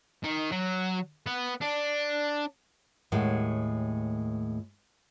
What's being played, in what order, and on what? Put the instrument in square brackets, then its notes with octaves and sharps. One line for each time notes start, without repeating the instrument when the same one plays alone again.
[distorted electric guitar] D#3
F#3
B3
D4
[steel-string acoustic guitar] D#2 A2 G#3 F#5